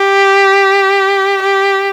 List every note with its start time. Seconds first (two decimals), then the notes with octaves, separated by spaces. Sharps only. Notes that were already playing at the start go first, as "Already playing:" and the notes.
Already playing: G4
1.42 G4